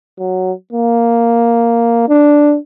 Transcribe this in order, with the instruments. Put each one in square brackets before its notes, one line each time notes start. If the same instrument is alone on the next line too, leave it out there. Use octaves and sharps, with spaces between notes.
[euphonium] F#3
A#3
D4